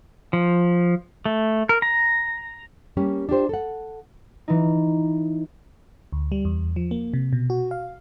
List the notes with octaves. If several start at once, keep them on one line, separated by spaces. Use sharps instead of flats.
F3
A3
A#4
A#5
G3 A#3 C#4 G4
D4 F4 G4 C5
A4 F#5
E3 D#4
D2
G3
E2
F3
A#3
C3
B2
F#4
F5